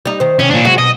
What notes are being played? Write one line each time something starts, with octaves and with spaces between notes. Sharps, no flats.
G3 D#4
D#3 C5
C3 D#3 C#4
A#2 D4
C3 F#3 G#3 F#4
B2 D#5